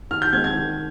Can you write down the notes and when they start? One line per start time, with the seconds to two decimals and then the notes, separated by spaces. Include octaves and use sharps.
0.11 D#3 F6
0.22 G6
0.33 G#3 C4 G#6
0.44 G#6
0.55 D#3